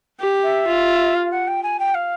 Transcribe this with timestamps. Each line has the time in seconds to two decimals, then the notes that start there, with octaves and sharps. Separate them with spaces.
0.20 G4
0.43 E5
0.68 F4
1.15 F5
1.31 F#5
1.47 G5
1.63 G#5
1.79 G5
1.94 F5